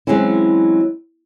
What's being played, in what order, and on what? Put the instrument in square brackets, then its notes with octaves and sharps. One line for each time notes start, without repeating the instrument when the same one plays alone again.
[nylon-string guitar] E3 F#3 G#3 C4 C#4 E4